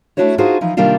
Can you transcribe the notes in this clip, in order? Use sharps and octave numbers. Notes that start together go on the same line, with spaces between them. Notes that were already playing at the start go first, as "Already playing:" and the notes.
A3 B3 D4 E4 F#4 C#5
D4 D#4 F4 F#4 G#4 C5
E3 F3 D#4
C3 D#3 G3 A#3 D4 F4